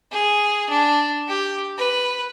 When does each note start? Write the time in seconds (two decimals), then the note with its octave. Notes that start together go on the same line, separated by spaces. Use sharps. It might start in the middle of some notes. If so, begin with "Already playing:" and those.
0.12 G#4
0.69 D4
1.28 G4
1.78 B4